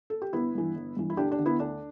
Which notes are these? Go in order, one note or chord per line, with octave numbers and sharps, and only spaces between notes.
A4
G4
G1 B3 E4
G2 E3
G1
G2 E3
E4
D2 D4 G4
D4 G4
D3
B3 E4
D2 D4